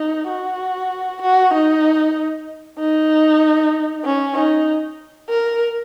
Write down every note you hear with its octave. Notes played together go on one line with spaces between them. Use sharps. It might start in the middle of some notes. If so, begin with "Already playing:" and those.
Already playing: D#4
F#4
F#4
D#4
D#4
C#4
D#4
A#4